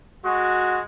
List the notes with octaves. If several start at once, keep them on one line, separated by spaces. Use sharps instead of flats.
G#3 F#4